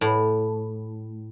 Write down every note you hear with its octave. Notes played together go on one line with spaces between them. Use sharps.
A2